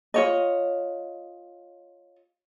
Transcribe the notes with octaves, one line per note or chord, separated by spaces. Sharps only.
F4 C#5 D#5